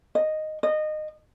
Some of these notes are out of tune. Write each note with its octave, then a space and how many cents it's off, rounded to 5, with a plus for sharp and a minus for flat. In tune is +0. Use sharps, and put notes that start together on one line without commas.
D#5 -5
D#5 -20